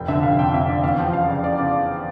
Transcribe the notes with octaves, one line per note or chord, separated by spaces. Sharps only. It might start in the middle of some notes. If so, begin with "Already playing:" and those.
Already playing: F1 G5
D3 E5
F1 F5
F2 G5
F2 E5
D3 D5
E2 F5
F3 G5
C#3 F5
C#3 D5
C#3 D5
C#3 D5